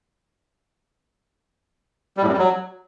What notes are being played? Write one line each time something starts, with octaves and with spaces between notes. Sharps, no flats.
G3
A2
F#2
G3
F#3